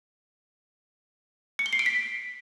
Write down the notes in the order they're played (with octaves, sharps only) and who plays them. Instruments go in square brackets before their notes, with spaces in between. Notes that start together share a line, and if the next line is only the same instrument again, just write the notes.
[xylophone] C#7
G7
C7
D7
B6